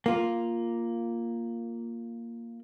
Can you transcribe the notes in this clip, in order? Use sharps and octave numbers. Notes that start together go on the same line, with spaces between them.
A#3 F4